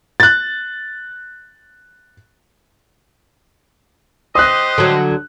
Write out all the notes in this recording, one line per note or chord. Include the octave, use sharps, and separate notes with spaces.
F#6 A6
G4 C5 D#5 D#6 F#6
D3 F#3